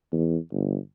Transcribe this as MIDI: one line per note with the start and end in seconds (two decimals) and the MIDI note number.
0.12 0.37 40
0.52 0.77 31